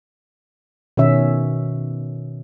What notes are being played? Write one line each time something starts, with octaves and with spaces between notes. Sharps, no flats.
B2 D#3 C#4 E5